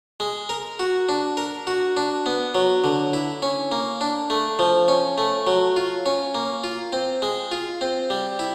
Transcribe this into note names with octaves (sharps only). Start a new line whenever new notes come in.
G#3
A#4
F#4
D4
A#4
F#4
D4
B3
F#3
D3
E4
C#4
A#3
D4
A3
F3
C#4
A3
F#3
F4
C#4
A#3
F4
C4
G#3
F4
C4
G3
E4